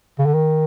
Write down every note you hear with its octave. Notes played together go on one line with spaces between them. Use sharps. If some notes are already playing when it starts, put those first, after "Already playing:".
C#3
D3
D#3